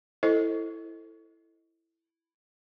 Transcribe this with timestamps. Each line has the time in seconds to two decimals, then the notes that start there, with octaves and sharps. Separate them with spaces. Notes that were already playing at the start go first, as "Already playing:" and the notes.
0.23 E4 A4 C5 D#5